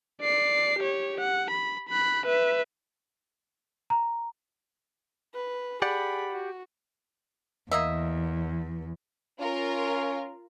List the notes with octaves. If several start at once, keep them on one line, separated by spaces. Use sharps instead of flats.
D5 C7
G4 C#5
F#5
B5
B5 F#6
B4 E5
A#5
B4
G4 G#4 D5 F#5 B5
F#4
E2 A#3 D#5 E5
C#4 F4 A#4